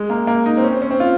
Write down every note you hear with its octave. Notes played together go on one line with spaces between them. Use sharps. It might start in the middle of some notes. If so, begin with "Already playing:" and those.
Already playing: G#3
A#3
A#3
D#4
C4
C#4
C4
C#4
C4
F4